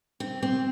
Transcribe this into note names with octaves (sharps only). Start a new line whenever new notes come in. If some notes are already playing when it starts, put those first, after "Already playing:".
C4
C4